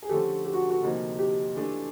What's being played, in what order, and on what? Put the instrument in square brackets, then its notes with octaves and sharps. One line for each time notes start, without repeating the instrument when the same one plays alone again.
[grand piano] G#4
[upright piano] D3 F3 A3 C#4 [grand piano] G4 A4
[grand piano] G4
F#4
F#4
[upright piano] D2 C3 F3 A#3 D#4
[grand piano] G4
[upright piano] E3 A3 D4 F4